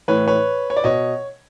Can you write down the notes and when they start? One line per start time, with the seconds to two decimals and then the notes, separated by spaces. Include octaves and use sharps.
0.08 A2 E3 B4 C#5
0.28 B4 C#5
0.70 C#5
0.77 D5
0.84 B2 C#5 D#5